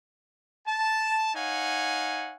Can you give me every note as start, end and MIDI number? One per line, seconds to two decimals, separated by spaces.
0.67 1.30 81
1.35 2.36 63
1.35 2.36 73
1.35 2.36 77
1.35 2.36 78
1.35 2.36 80